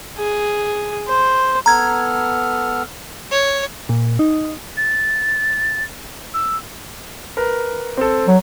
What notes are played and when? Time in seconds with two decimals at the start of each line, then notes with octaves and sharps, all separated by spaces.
0.18 G#4
1.08 C5
1.66 B3 A4 A#5 F6 G#6
3.31 C#5
3.89 A#2
4.19 D#4
4.77 A6
6.34 E6
7.37 A#4 B4
7.97 C4 A4
8.27 F#3